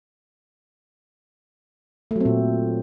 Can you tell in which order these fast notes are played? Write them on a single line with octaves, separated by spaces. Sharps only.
A3 F#3 C4 A#2